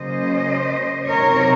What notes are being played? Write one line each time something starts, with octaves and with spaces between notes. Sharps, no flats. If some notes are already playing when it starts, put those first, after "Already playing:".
Already playing: C#3 F#3 A#3 C#4 C5 D#5
C3 F#3 C4 D#4 A#4 C#5